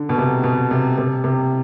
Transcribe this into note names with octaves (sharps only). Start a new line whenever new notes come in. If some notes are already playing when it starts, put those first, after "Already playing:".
Already playing: D3
B2
C3
B2
C3
C3
C3